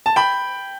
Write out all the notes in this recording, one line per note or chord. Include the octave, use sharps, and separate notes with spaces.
A5
G5 B5